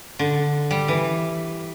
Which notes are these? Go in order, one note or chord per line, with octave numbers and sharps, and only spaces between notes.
D3
G3
E3